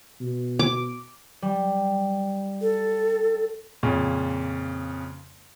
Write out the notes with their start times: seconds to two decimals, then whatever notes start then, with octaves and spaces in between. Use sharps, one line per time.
0.21 B2
0.59 D6
1.42 G3
2.62 A4
3.83 F2 A#2 C#3